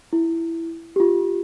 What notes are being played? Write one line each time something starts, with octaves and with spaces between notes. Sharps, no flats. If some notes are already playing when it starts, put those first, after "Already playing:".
E4
F4 G4